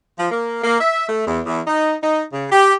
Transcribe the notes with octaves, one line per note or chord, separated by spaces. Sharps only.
F3
A#3
A#3
E5
A3
E2
E2
D#4
D#4
C#3
G4